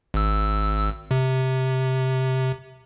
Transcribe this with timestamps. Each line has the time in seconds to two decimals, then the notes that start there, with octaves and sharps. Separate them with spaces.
0.14 G#1 E6
1.11 C3